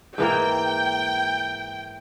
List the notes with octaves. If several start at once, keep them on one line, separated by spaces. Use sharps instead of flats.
G#2 E3 A#3 G5